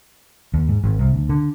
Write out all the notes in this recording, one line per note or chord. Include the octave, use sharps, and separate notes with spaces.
D#2
G#2
G#1
C2
D2
D3